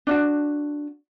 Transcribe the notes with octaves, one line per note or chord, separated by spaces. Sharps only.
D4 F4 F#4